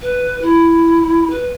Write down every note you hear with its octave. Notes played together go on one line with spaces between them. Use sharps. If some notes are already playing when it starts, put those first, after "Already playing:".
B4
E4
B4